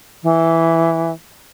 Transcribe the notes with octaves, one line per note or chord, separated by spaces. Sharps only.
E3